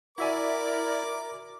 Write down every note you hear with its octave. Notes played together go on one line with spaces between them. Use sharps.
E4 F#4 A#4 D5 E5 G#5 D6